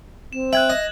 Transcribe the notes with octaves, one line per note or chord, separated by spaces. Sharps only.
C4 E7
E5 G5 F#6 G#6 F#7
D#5